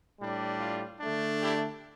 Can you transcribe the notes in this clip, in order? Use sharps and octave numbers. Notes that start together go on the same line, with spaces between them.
A2 G3 D4
F4
D3 A3 D4
E4 G4